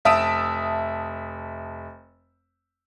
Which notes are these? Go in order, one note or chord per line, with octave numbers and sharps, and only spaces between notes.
F1 E5 A5 D#6 D7 E7